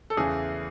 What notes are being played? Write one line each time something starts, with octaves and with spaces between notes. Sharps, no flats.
A4
E2 C#3 E3 A3 G#4